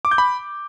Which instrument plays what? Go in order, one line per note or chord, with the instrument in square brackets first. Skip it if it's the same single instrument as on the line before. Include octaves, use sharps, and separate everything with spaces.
[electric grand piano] D6
G6
B5